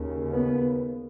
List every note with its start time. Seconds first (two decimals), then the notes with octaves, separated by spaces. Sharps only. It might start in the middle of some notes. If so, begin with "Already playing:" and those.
Already playing: D#2 C#3
0.32 B3